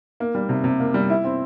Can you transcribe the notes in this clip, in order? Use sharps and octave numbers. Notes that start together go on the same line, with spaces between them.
A#3
G3
C3
C3
A#3
G3
E4
C4